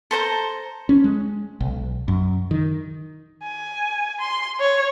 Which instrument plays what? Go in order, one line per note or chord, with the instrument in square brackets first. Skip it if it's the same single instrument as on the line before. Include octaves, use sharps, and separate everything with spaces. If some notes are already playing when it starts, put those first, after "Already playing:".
[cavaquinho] A4 C5 A#5
[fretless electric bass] C#4
G#3
B1
F#2
D#3
[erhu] G#5
C6
C#5